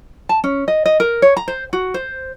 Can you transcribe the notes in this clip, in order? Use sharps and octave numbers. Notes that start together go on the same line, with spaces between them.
A5
C#4
D#5
D#5
A#4
C#5
A#5
C5
F#4
C5